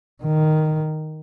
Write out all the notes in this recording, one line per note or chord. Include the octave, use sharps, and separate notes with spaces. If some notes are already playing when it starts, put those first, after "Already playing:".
D#3